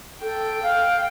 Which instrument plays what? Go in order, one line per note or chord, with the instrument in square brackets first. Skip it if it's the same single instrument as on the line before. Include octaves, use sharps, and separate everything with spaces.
[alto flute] A4 [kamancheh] G5
[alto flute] F5